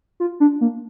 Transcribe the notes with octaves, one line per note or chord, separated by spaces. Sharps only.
F4
D4
A#3